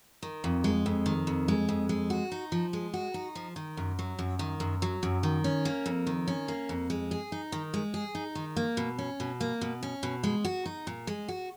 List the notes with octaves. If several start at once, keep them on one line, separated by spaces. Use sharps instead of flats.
D#3
F2
G#3
F2
D#3
F2
G#3
F2
G#3
F#4
D#4
F3
G#3
F#4
D#4
F3
D#3
F#2
F#3
F#2
D#3
F#2
F#3
F#2
D#3
C#4
A#3
F2
D#3
C#4
A#3
F2
G#3
G#4
D#4
D#3
G#3
G#4
D#4
D#3
A#3
B2
C#4
B2
A#3
B2
C#4
B2
G#3
F#4
D#4
A#2
G#3
F#4